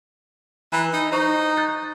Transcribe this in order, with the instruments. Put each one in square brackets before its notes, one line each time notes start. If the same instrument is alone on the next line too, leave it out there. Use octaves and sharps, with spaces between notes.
[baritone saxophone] E3 [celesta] A#5 B5 F#6
[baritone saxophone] D#4
[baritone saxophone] D#4 [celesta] C5 A#5 C#6
[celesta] F#6 G6 A6